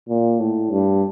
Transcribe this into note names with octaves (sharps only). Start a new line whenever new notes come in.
A#2
A2
G2